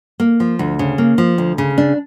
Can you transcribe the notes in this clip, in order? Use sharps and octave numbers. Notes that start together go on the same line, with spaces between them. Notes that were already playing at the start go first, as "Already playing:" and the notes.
A#3
F3
D2
C#3
A#3
F3
D2
C#3
D4